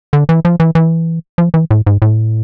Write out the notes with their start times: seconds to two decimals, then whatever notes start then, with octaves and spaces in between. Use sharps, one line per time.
0.13 D3
0.29 E3
0.45 F3
0.60 E3
0.75 E3
1.38 F3
1.54 E3
1.71 A2
1.87 G#2
2.02 A2